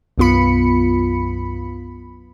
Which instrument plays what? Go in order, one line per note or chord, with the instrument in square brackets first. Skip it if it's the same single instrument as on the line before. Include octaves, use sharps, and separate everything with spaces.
[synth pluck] B1 F#2 B3 F4 B5 C#7